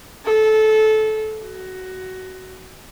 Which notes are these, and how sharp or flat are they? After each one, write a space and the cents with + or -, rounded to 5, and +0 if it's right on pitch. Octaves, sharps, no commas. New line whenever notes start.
A4 -20
F#4 +15